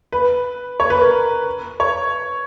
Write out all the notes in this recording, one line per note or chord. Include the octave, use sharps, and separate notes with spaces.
B4
C#5
B4
A#4
C#5